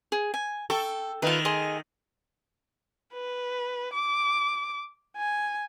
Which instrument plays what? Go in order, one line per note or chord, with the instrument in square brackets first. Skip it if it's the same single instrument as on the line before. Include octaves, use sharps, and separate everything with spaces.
[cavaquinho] G#4
G#5
[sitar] A4 [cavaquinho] G5 C#6
[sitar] D#3 A3 [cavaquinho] F4 B4
[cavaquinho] G#4 D#5 C6
[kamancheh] B4
D6
G#5